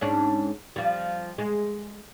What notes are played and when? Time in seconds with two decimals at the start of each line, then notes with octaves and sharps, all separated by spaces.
0.01 G#2 C#4 D4
0.76 F3 G3
1.38 G#3